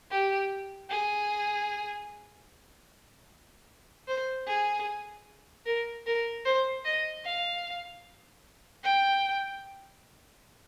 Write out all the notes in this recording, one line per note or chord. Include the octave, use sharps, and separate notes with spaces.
G4
G#4
C5
G#4
A#4
A#4
C5
D#5
F5
G5